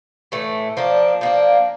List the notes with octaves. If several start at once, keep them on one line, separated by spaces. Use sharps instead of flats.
A2 E3 A3
F3 A#3 D4
F3 A#3 D4